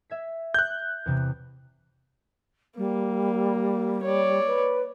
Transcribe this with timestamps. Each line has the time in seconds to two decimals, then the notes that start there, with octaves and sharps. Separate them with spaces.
0.10 E5 G#6 B6
0.54 F#6 G6
1.06 E2 C3
2.77 G3 A#3
4.03 C#5 D5
4.47 B4